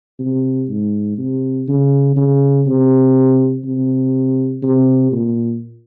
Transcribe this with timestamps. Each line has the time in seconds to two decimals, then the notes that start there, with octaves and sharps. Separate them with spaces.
0.19 C3
0.69 G#2
1.18 C3
1.68 C#3
2.17 C#3
2.66 C3
3.64 C3
4.63 C3
5.12 A#2